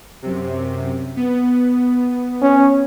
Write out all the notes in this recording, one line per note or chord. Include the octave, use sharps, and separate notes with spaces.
F#2 C3
B3
C#4